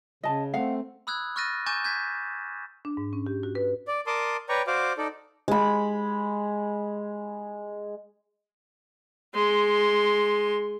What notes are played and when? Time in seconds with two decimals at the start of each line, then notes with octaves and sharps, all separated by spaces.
0.23 C#3 D#5 A5
0.54 A3 C4 F5 F#5
1.07 B5 D#6 E6 F#6 G#6
1.36 C#6 F6 F#6 A6 A#6 D#7
1.66 G#5 C#6 D6 G6 A6 E7
1.84 G6 G#6 B6
2.85 D4
2.97 G#2
3.13 C#4
3.27 G4
3.43 F#4
3.55 B4
3.87 D5
4.07 A#4 D5 A5 C6 D6 D#6
4.49 B4 C#5 D5 G5 A#5 C#6
4.67 F#4 C5 D5 F5 D6
4.98 D#4 A4 D5
5.48 G#3 B5
9.34 G#3 C6